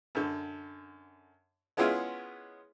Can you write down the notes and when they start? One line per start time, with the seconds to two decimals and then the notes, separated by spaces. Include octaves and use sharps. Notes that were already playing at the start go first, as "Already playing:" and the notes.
0.15 F#2 D3
1.77 G#3 B3 C#4 E4 F4 G#4